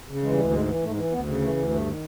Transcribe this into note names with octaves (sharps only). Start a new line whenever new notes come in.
C#3
E3 G#3
G3
D2 G#3
G#2 G#3
E3
G#2 A3
E3
D2 B3
C#3
E3 A3
D2
G2 A3
D#3